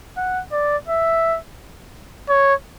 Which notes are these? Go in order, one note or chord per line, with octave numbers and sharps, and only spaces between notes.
F#5
D5
E5
C#5